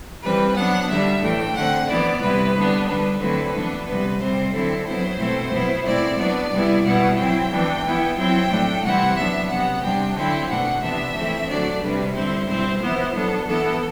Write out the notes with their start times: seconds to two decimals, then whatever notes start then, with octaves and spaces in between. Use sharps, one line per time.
0.22 E3 G3 C4 B4
0.54 F#3 B3 D4 F#5
0.88 D3 G3 D4 E5
1.21 A2 E3 A3 D4 G5
1.54 D3 A3 C4 F#5
1.87 E3 B3 E4 D5
2.20 C3 G3 B3 E4 B4
2.53 D3 G3 B3 D4
2.86 D3 G3 D4 B4
3.19 D3 F#3 A3 C4 E4 B4
3.53 E3 B3 D4
3.86 C3 G3 B3 B4
4.19 C3 G3 C4 C5
4.52 D3 F#3 C4 E4 A4
4.85 F#3 B3 E4 C5
5.18 B2 A3 C4 E4
5.51 B2 F#3 B3 E4
5.84 B2 A3 C4 E4 D5
6.17 F#3 B3 D4 D5
6.50 C3 G3 B3 E4
6.84 B2 G3 B3 E4 F#5
7.16 F#3 C4 E4 G5
7.50 E3 B3 D4
7.84 E3 B3 E4
8.16 F#3 C4 E4 G5
8.49 A2 F#3 A3 D4
8.82 C3 E3 G3 C4 E4 F#5
9.16 F#3 B3 D4 E5
9.48 C3 F#3 B3 F#5
9.81 C3 G3 D4 G5
10.14 D3 F#3 C4 E4 G5
10.48 B2 A3 D4 F#5
10.81 C3 E3 B3 D4 E5
11.14 E3 A3 C4 E4
11.47 D3 F#3 A3 D4 D5
11.80 C3 G3 D4 B4
12.13 D3 G3 C4 E4 C5
12.46 B2 G3 C4 E4 C5
12.80 E3 B3 E4 C5
13.12 F#3 B3 D4 A4
13.46 E3 B3 E4 A4